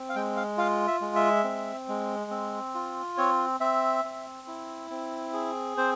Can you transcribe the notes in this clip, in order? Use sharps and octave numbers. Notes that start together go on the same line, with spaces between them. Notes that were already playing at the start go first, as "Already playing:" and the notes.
Already playing: C4
F5
G#3 G5
F5
F4 F5
E5
G#3
E5
C4
G#3
C4
F4
C4 C#5
C4 E5
C4
E4
C4
G#4
C4 C5